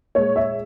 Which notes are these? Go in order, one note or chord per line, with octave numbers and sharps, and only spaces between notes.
A#2 G#3 C#5
E5